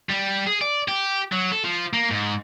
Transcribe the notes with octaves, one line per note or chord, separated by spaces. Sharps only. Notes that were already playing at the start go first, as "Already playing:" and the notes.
G3
G#4
D5
G4
F#3
A4
F3
A#3
G#2